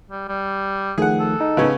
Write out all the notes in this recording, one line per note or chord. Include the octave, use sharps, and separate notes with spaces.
G3
G3
D#3 F3 A3 G#4 F#5
A4
D#4
C#3 B3 C#4